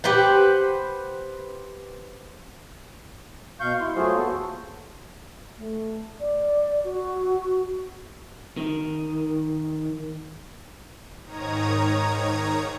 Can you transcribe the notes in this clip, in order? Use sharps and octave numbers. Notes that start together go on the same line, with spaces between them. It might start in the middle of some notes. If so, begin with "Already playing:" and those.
G4 B4 C5 F#5
B2 F5 C#6 G6
E4 C6
F#3 A3 F4 F#4 G#4 C5
D#2 B3 F#4 A4
A3
D5
F#4
D#3
G#2 D#3 C#5 A#5 D#6 G#6